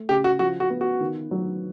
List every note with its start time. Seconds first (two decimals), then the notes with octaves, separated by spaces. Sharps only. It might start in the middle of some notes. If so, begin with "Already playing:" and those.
Already playing: A3
0.09 C#3 G4
0.24 F#4
0.39 F3 F#4
0.60 F#4
0.70 B3
0.81 F#4
1.00 D#3
1.31 F#3